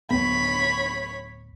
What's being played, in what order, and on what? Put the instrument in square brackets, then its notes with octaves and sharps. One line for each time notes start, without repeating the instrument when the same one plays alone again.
[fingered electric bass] D1 B3 [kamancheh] C#5 B5